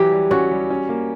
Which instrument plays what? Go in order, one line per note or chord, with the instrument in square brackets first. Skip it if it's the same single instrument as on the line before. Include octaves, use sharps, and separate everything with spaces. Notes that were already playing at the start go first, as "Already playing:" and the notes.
Already playing: [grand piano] E3 F#3 [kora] G4
[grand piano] G3
[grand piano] C#4 [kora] F#4
[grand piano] G3
C#4
A#3